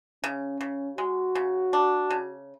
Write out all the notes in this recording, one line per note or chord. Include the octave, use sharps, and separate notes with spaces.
C#3 C#4
C#3
G#3 F#4
C#3
D4
C#3